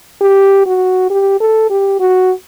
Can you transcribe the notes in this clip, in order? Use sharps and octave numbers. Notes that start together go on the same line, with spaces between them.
G4
F#4
G4
A4
G4
F#4